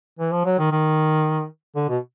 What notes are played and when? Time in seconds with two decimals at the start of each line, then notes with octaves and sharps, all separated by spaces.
0.19 E3
0.32 F3
0.45 F#3
0.59 D#3
0.71 D#3
1.76 D3
1.89 B2